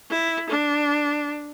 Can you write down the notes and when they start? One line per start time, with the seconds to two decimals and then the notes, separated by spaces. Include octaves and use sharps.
0.10 E4
0.49 D4